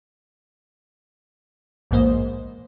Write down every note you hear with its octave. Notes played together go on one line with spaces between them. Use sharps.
A#1 E2 G#2 A#3 C5 D#5